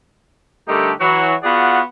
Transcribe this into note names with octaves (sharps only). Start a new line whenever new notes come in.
D3 G3 A3 D#4 G4 A#4
E3 F#3 F#4
B3 F4 F#4 G#4 D5 F#5